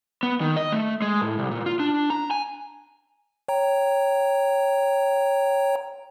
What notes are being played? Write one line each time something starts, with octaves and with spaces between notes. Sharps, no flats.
B3
D#3
D#5
A3
G#3
A2
C2
A#2
F4
D4
A#5
G#5
C#5 G5 A#5